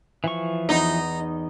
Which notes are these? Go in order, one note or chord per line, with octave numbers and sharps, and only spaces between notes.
E3 F3 C#6
E2 D#4